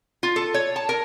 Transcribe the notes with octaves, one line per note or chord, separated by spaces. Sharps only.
F4
A4
C#5
A5
A#4